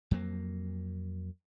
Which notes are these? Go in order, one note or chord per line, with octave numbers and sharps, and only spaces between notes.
F2 F#3 A#3